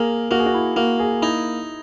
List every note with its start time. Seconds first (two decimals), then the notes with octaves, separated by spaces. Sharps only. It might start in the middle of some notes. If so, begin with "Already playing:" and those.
Already playing: A#3 G#4 A#4
0.31 A#3 F#4
0.39 G#4
0.46 F#4
0.54 E4
0.76 A#3 F#4
0.99 G#4
1.22 D#4 E4